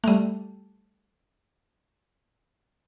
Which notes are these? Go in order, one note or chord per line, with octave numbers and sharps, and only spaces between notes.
G3 A3